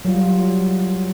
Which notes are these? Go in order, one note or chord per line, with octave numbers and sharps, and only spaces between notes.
F#3 G3 F4